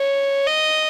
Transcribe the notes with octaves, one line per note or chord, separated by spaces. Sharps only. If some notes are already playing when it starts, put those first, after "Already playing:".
Already playing: C#5
D#5